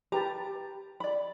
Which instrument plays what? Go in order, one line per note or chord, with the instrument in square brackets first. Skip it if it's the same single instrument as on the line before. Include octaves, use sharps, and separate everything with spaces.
[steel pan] G4 B4 A5 [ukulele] A#5
[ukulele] D5 B5